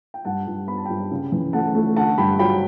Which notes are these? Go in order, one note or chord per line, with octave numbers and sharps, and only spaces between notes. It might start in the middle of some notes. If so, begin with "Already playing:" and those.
G5
G2 F#5 A5
G2
B3 B5
A5
G2 G5 B5
C#3
E3
A3 F#5 A5
A3
D3 F#5 A5
G2 G5 B5
F#3 G5 B5